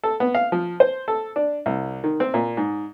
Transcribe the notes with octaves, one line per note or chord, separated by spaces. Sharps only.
A4
B3
F5
F3
C5
A4
D4
C2
D#3
C4
A#2
G#2